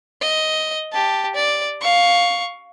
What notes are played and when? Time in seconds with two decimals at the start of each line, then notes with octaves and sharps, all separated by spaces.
0.21 D#5
0.92 G4 A5
1.35 D5
1.81 F5 C#6